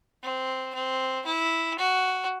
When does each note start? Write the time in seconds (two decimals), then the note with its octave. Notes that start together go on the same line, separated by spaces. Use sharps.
0.23 C4
0.74 C4
1.26 E4
1.79 F#4